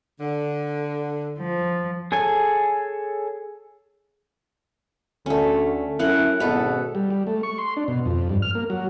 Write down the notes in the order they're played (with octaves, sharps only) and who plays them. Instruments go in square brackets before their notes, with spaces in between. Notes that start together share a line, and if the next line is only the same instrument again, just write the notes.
[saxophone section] D3
[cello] F3
[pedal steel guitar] G#4 A4 C#5 G#5
[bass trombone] D2 [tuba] D3 [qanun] A3 C#4
[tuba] F#2 [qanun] C#4 A#4 F#5 [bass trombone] E4
[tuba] G#1 [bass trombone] B2 [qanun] B3 A4
[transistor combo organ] G3
G3
A3
C#6
C6
D4
B2
F2
G2
F6
A#3
F#3